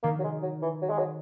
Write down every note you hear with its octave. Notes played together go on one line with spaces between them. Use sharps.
D#3 A#3
F#3
G#3
F#3
E3
F#3
G#3
F#3